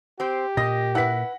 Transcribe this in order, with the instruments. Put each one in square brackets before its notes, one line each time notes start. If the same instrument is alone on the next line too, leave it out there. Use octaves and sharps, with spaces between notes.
[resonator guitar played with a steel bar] C4 C5 [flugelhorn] G4
[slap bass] A#2 [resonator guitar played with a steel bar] D#5 [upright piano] A#6
[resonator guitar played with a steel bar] E4 B4 [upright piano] F#5 B6